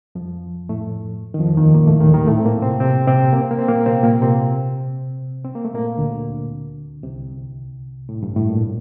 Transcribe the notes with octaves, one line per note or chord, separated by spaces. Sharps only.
F2 F3
A2 A3
D#3
F2 F3
D#2 D#3
A#2 A#3
A2 A3
D#2 D#3
D#2 D#3
A2 A3
C4
A#2 A#3
C3 C4
C3 C4
C3 C4
A#3
C4
A#3
C4
A#2 A#3
C3 C4
A#2 A#3
C3 C4
C4
A#3
A3
A#2 A#3
D2 D3
C2 C3
A2
G2
A2
A#2